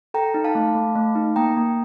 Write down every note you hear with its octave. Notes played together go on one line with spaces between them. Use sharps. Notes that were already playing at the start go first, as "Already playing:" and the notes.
A4 G5 A#5
D#4
F5 A5
A3
A3
A3
D#4
A#3 G5 A#5
A#3